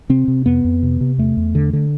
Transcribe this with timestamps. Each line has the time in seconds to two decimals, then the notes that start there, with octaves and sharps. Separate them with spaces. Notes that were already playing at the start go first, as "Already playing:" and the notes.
0.09 C3 C4
0.28 C3
0.46 F2 B3
0.65 F2
0.83 C3
1.01 C3
1.18 E2 A3
1.37 E2
1.55 D3
1.73 D3